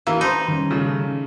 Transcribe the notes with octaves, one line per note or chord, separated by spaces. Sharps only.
E3 A#3 E4
D#4 C5 A5 B5
D#3 G3 C#4
A#2 C#3 A3